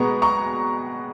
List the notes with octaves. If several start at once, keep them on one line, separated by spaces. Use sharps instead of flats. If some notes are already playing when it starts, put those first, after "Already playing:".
Already playing: B2 G#3 B3 A#5 C#6
A#5 C#6